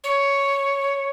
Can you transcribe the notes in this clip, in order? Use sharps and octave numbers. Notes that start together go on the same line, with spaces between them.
C#5